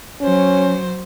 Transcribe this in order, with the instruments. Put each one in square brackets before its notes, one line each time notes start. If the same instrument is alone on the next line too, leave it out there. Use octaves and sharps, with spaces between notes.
[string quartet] F#3 C5 [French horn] C#4